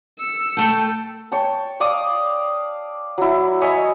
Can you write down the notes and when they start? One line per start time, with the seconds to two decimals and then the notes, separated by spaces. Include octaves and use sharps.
0.19 E6 C#7
0.57 A3 G5 A5
1.32 C#5 G5 A5
1.80 D5 F5 D6 D#6
3.18 F#3 E4
3.61 C#5 D#5 E5 G#5